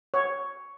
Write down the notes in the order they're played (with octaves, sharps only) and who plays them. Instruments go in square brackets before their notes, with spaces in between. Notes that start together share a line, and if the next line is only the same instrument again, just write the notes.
[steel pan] C#5